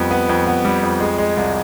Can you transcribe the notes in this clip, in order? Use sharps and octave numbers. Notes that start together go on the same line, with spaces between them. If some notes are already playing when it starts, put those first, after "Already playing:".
Already playing: F2 G3 B3
B3
F2
B3
G3
F2
G#3
G#3
C2